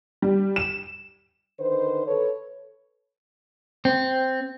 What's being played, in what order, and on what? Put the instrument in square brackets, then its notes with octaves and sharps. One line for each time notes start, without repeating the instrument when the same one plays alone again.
[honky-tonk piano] G3
E7
[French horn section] D3 D#3 B4 C5
A4 B4 C#5
[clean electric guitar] C4